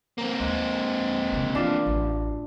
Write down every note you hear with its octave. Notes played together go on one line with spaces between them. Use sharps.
A#3 C4
D#2 G#3
C#3 D4
E3 D4 F4
A1